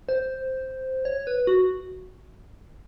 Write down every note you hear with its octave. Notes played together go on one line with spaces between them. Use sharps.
C5
C#5
B4
F#4